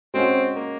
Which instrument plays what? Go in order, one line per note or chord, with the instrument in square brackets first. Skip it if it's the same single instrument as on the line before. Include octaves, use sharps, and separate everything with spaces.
[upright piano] G#3 C#4 F#4 [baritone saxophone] C4
[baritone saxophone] A#3